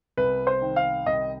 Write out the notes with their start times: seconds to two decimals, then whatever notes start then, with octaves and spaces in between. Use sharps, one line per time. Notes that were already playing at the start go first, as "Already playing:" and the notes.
0.17 C2 B4
0.47 C5
0.62 D#3
0.76 F5
1.06 C2 D#5